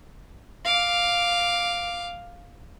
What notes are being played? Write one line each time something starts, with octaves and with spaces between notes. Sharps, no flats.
F5 D6